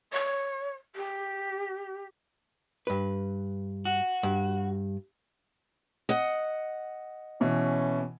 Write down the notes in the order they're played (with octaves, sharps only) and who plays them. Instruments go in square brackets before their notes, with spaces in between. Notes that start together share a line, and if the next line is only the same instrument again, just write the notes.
[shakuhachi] C#5
G4
[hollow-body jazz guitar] G2 B4
[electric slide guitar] F#4
[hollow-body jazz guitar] G2
[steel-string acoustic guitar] D#5 F#5
[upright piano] B2 E3 [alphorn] C#4